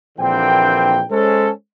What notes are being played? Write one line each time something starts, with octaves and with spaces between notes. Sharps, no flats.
A#1 D3 E3 A#3 C4 G5
G#3 C#4 A4 C5